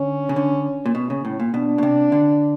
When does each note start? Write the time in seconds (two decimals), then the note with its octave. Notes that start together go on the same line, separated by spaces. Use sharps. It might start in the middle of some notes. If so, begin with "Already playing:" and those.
Already playing: D3 C#4
0.29 C#3
0.36 D3
0.86 A#2
0.95 B2
1.10 C#3
1.25 A2
1.40 A#2
1.54 B2 D4
1.78 B2
1.83 C3
2.12 D3